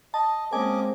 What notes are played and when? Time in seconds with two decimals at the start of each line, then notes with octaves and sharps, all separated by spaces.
0.14 D#5 A5
0.53 G#3 A#3 C4 C#4 D#5 G#5 D6